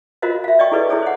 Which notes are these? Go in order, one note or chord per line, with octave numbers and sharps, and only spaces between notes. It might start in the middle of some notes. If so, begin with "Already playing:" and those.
F4 F#4 A#4 C5 D#5 F5
E5 F5
D5 D#5 G5 C#6
E4 G#4 A4 B4 D5 D#5
E4 G#4 A4 C#5
C5 F#5